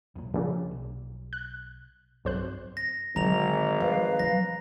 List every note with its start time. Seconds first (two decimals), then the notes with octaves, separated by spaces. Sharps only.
0.16 E1 B1 A#2
0.34 A#1 A#2 C#3 F3
0.71 B1
1.33 F#6
2.25 B1 G2 C4 C5 F#6
2.77 A#6
3.16 G#1 D3 F#3 A#5 F7
3.80 F3 B4 F5
4.19 F3 F#3 A#6